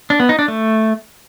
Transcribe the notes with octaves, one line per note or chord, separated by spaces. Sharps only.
D4
B3
D#4
D4
A3